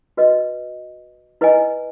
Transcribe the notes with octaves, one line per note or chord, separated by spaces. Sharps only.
F#4 B4 D#5
E4 B4 D#5 G#5